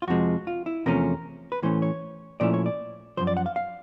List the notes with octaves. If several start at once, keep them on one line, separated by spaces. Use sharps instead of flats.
F4
F2 C3 F3 G#3 F#4
F4
E4
E2 C3 F3 A3 C#4 A#4
B4
A2 E3 A3 C#4 C5
C#5
A#2 F3 A3 C#4 E4 D5
C#5
D5
F#2 C#3 F3 C5
D5
F#5
F5
F5